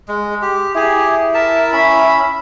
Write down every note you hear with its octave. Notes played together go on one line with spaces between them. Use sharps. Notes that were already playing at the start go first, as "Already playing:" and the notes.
G#3
G4
E4 G4 G#4
A#4 E5 A5
C#4 E5 B5